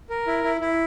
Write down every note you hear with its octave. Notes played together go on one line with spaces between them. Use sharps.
A#4
E4
E4
E4